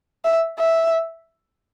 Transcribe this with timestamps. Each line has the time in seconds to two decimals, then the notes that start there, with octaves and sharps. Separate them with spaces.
0.25 E5
0.59 E5